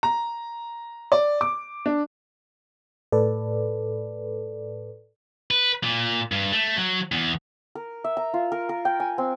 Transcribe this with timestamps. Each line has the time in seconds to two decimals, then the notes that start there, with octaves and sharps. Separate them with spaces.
0.03 A#5
1.12 D5
1.41 D6
1.86 D4
3.12 A2 A4 B4 D5
5.51 B4
5.84 A#2
6.32 G2
6.53 A3
6.77 F#3
7.12 E2
7.75 A#4
8.04 E5
8.17 A#5
8.34 F4
8.52 A#4
8.69 A#4
8.85 G5
9.00 G#5
9.18 C4